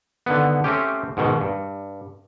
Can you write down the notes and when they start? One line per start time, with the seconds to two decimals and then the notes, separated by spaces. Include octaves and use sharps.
0.26 D3 D#3 B3
0.64 A3 C4 C#4 G4
1.17 G#2 B2 D#3
1.41 G2